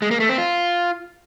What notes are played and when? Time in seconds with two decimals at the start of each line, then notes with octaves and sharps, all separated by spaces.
0.02 G#3
0.11 A#3
0.20 A3
0.29 C4
0.38 F4